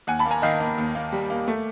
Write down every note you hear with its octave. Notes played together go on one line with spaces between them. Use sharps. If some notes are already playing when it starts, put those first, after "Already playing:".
D#2 F#5 G#5
A5 B5
A#3
G#5 A#5
D#3 D#5 F5
A#3
D#2
A#3
G3
A#3
A3